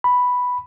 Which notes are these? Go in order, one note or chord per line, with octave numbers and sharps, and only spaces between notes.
B5